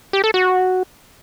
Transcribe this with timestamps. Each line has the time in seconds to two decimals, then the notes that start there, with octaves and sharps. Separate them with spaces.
0.13 G4
0.24 A4
0.34 F#4